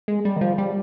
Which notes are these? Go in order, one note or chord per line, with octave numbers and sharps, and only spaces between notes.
G#3
G3
D#3
F3
G3